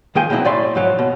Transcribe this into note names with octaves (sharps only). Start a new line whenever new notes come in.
D#3 F3 G#4 G5 G#5
B2 F#3 C4 E4 D#5
A2 D5 E5 C6
G#2 F3 F#3
B2